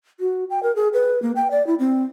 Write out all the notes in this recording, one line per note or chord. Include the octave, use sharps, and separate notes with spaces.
F#4
G5
A#4
G#4
B4
A#3
G5
D5
E4
C4